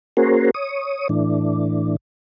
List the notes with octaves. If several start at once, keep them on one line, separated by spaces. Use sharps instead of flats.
A#3 C#4 F#4 G#4 A#4 C5
C#5 D#6
A2 E3 D4